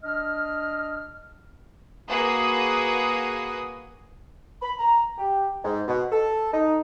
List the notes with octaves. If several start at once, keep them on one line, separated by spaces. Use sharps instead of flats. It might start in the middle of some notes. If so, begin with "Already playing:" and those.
D4 D#5 F6
A#3 F#4 G#4 B4 D#6
B5
A#5
G4
G#2
B2
A4
D#4